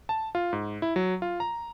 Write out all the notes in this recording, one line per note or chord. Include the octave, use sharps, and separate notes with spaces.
A5
F4
G#2
E4
F#3
F4
A#5